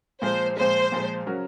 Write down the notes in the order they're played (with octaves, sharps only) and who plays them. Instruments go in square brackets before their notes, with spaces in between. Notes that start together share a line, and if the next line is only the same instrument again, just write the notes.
[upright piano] A#2 F3 G#3 [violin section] C5
[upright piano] A#2 F3 G#3 [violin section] C5
[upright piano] A#2 F3 G#3
C#3 F#3 C#4 F#4 A#4